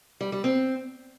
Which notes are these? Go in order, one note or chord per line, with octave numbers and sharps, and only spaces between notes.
G3
G3
C4